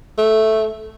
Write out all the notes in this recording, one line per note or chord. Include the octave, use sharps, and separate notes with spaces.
A3